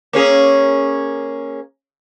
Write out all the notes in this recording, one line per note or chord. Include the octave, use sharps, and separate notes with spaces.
A#3 C#4 G#4